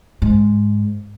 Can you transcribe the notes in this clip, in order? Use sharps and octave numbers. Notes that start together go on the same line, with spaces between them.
G#2